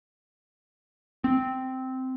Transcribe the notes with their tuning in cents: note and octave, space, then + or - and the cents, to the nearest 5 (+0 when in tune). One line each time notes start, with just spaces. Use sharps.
C4 -10